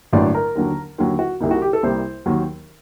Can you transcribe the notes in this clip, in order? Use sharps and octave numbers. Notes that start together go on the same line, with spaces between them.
A1 G2 D3 F#3 A#3 D5
A#4
D#2 D3 F#3
D#2 D3 F#3
F#4
C2 C3 G3 A#3 D#4
F#4
G4
A4
C2 C3 G3 A#3 C5
D#2 D#3 F#3